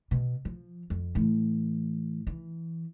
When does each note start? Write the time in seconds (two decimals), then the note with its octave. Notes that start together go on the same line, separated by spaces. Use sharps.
0.11 B2
0.45 F3
0.90 F2
1.15 A2 E3
2.27 E3